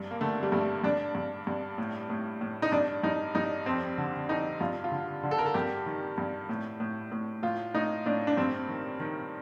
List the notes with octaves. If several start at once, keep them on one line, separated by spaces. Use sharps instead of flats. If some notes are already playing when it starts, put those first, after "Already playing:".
Already playing: G2
A#3
D3 A3
G3
G2 A3
G2 D4
G2
G2
A2
A2
A2
D#4
G2 D4
G2 D#4
G2 D#4
F2 C4
D3
F2 D#4
G2 F4
F4
D3
D3
A4
A#4
A4
G2 G4
D#3
G2
A2
A2
A2
A2 F4
A2 D#4
A2 D4
D4
G2 C4
D#3
D#3